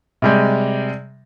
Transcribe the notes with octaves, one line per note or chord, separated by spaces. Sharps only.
C3 G3 G#3